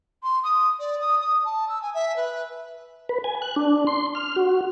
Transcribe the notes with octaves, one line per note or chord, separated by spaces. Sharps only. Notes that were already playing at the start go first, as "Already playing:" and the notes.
C6
D#6
D5
D#6
D#6
A5
E6
G#5
E5
B4
B4
G#5
F#6
D4
C6
F6
F#4